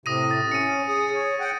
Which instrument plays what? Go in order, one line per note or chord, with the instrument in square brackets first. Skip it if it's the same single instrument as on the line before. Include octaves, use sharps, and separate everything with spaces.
[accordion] A2 C3 [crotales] D#6 A#6 D#7
[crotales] A6
[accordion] C#4 [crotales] C#7 D#7
[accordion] G#4 D#6
C#5
F#5 G5